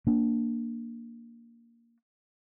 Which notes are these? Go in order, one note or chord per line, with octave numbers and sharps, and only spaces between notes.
A#3 D4